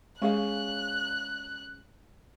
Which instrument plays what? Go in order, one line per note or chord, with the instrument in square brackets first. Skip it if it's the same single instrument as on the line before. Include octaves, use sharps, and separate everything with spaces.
[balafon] G#3 [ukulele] C#4 G#4 F5 [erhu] F#6